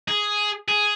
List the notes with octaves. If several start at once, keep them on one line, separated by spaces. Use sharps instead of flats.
G#4
G#4